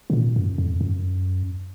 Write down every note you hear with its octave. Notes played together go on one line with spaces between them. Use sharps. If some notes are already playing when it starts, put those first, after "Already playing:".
C3
A#2
F#2
F2
F#2